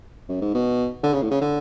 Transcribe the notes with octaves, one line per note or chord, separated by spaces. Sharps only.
F#2
G#2
B2
D3
C#3
A2
C#3
D3